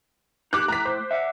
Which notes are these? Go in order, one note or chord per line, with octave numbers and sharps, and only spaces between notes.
D#4 G4 D6 F#6
A2 A#5 B6
C5
E5 F#5